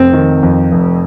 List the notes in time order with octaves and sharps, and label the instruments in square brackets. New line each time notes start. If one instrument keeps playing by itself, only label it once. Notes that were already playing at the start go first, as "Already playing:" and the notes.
Already playing: [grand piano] F1 [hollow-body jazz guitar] C4
[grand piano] D#3
F2
F1